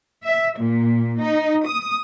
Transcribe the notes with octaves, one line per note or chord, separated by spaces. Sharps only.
E5
A#2
D#4
D#6